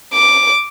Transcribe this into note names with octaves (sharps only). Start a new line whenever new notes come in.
D6